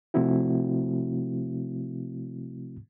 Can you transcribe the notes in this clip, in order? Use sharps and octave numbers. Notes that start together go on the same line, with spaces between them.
C3 F3 A3 C4 E4 F#4